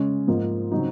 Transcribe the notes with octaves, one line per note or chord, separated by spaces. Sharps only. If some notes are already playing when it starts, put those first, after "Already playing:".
Already playing: C#3 G#3 C#4
G#2 F3 A#3
C#3 F#3 C4 D#4